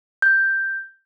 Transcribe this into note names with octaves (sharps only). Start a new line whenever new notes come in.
G6